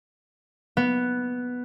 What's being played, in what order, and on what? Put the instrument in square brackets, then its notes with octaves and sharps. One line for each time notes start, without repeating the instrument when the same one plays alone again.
[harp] B3